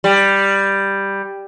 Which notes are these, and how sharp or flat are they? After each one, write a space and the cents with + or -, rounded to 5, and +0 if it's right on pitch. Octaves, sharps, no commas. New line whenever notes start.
G3 +5